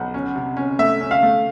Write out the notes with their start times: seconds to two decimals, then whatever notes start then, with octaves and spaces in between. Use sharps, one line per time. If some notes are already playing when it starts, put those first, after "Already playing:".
Already playing: B1 F#5
0.14 C#4
0.36 C3
0.57 C#4
0.79 A3 E5
1.01 C#4
1.11 F5
1.23 A3